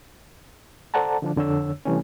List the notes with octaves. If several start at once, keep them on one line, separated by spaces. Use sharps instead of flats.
A4 C5 D5 F#5 A5 A#5
D3 F3 D4
F2 D3 D4 C#5 E6
C3 E3 G3 A3 C#4